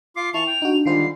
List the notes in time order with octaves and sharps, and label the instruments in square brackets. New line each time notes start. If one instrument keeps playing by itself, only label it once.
[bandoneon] F4 D6 [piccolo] C7
[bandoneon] E3 A5 C#6 [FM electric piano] E4 [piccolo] F7
[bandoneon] G5
[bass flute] D4 [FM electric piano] D#4 F#4
[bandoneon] D3 G3 G#3 [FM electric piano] D#3 F4 C5 [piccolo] C7